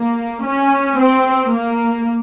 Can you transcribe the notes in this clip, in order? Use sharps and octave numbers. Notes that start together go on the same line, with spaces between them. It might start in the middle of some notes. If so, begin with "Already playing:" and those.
Already playing: A#3
C#4
C4
A#3